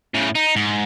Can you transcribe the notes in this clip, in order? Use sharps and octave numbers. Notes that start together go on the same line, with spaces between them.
A2 C#3
D#4
G#2